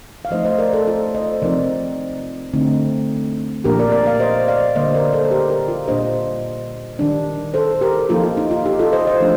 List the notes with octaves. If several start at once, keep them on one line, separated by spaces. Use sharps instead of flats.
F5
F3 A3 D#4 C5 D#5
C5 D#5
A#4 D5
A4 C5
F4 A4
C5 D#5
C3 F3 C4 D#4 A#4 D5
D3 A3 C4 D#4
A#2 F3 A#3 D4 G4 A#4
A#4 D5
A#4 D5
D5 F5
C5 D#5
D5 F5
D3 G3 A#3 C5 D#5
A#4 D5
A4 C5
G4 A#4
G4 A#4
F4
A#2 G3 A#3 D4 C5 D#5
D#3 G3 D4
A4 C5
G4 A#4
F3 A#3 D#4 F4 A4
F4
D#4
F4
D#4 G4
F4 A4
C5 D#5
C5 D#5
F3 A3 D4